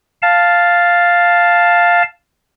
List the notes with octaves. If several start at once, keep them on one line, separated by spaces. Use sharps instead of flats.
F5 A5